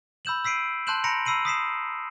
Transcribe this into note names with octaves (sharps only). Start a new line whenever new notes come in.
B5 E6 G6 E7 F#7
E6 B6 C7 D7 D#7
A5 C6 F#6 G6 E7 F#7
A#5 B5 A#6 C#7 D7 F7
B5 E6 C7 D#7 F#7
D#6 B6 C7 E7